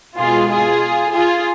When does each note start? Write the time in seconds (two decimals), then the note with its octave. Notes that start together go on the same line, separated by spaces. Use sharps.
0.18 B2 G#3 F4 G#4
0.50 F4 G#4
1.13 F4 G#4